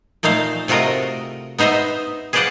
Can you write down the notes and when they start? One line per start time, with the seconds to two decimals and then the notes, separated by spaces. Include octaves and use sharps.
0.23 A#2 A3 D#4 C5 F5
0.68 C3 A3 F4 F#4 A#4 D#5
1.58 B3 D#4 C5 D#5 E5
2.33 G#4 B4 C5 D5 F5 F#5